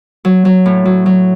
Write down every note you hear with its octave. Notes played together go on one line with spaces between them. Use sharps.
F#3
F#3
A2
F#3
F#3